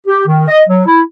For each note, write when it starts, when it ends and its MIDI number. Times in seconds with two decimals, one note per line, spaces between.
0.07 0.23 67
0.27 0.46 51
0.48 0.61 75
0.69 0.83 54
0.87 1.01 64